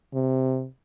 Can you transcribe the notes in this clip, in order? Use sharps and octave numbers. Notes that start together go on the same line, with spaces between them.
C3